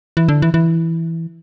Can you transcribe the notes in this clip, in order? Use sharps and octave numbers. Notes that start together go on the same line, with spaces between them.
E3
D3
E3
E3